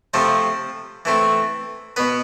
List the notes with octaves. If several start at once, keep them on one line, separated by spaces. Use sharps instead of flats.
C3 F3 A3 C4 C5
E3 A3 C4
B2 B3 B4